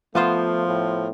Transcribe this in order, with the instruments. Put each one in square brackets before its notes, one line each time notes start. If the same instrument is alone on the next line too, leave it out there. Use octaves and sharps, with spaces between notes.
[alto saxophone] F3 [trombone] A3 [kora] B3 F4 C5
[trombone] A2